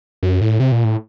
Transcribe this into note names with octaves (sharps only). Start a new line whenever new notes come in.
F#2
A2
C3
A#2
A2